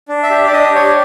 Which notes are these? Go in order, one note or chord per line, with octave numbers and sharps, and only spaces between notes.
D4
E5
G4
D5
D4 D#5
G4 C#5